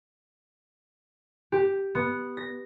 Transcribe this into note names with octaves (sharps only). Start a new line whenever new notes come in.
G4
B3
A#6